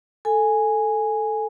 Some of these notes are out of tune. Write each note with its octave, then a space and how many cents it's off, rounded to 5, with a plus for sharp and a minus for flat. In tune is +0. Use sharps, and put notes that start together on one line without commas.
A4 +0 G#5 +0